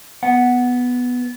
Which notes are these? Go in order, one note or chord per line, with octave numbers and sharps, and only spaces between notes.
B3 F#5